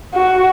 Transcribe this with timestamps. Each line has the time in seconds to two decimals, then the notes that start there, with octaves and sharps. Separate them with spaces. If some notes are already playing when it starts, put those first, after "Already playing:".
0.15 F#4